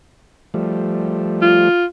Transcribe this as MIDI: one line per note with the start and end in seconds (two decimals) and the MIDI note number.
0.54 1.69 53
0.54 1.69 55
0.54 1.69 57
1.42 1.85 65